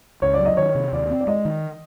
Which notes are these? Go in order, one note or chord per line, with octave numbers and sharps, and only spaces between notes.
C#2 C#5
D5
F#3
D#5
D#3 C#5
C3
D#2 D5
C4
D5
G#3 D#5
D#3